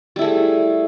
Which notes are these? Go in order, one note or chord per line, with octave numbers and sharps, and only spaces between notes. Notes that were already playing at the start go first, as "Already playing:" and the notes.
G3 A3 E4 G#4